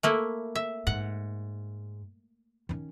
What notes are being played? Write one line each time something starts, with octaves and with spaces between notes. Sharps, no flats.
A3 A#3 E4
E5
G#2 F#5
D#3 C#4